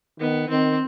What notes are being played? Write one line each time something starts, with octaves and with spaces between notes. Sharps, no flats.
D#3 B3
D#3 C4